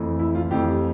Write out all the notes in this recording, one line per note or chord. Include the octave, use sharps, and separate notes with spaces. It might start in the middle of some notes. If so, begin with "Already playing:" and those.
Already playing: F2 E3 A3
E4
F4
F2 E3 A3 G4